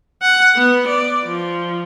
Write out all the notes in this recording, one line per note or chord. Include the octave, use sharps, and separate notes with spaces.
F#5
B3
D5
F3